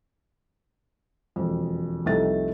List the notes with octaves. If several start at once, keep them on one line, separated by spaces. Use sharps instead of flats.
E1 F2
C2 F2 A3 D#4 A4 A6